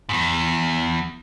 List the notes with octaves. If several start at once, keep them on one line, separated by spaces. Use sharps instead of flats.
E2 G#2